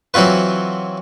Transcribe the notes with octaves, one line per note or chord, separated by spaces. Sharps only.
E3 F#3 C4 F4 B4